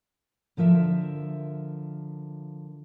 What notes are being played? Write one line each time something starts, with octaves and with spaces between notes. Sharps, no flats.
D3 F3 A#4 E5